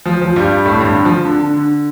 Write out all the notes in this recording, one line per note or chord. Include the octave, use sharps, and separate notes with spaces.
F3
F3
G2 G3
A2 A3
G2 G3
D3
F3
D3
D3
D3